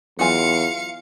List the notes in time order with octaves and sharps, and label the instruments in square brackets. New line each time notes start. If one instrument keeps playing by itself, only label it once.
[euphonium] E2 [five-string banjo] F#3 F4 G#5 [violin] F5 C#7